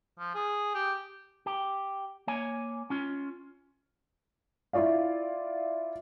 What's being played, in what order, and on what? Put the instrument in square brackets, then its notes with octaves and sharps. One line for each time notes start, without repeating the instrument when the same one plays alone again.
[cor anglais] F3
G#4
G4
[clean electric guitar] G4
A#3 C#5 G#5
C#4 F4
[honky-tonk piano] E4 F4 D5 F5